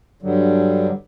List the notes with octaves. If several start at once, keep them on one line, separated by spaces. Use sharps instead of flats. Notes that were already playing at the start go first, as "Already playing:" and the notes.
G2 D3 F#3 G3